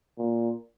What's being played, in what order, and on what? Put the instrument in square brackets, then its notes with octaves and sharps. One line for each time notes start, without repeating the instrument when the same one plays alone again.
[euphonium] A#2